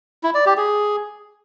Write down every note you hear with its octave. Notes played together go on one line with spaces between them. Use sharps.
E4
D5
G4
G#4